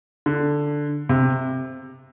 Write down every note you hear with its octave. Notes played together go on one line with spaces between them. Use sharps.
D3
C3